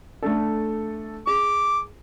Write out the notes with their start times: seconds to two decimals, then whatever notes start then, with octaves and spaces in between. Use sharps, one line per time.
0.23 A3 D4 A4
1.27 G#4 D6